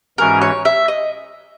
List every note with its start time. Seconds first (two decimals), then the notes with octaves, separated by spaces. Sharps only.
0.18 G#2 E3 G#3 C#4 F#4 A#4
0.41 C#5
0.65 E5
0.88 D#5